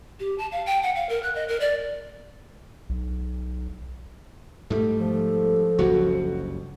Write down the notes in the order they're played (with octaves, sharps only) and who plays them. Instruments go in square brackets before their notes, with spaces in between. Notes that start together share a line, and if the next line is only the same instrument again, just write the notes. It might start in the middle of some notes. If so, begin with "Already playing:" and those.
[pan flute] G4
A5
F5
G5
F#5
F5
A#4
F#6
D#5
A#4
D5
[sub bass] B1
[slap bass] G#2 G3 [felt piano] A3
[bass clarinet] F3 [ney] A4
[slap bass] F#1 C#2 G2 [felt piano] F#4